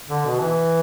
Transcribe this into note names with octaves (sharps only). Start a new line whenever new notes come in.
D3
B2
E3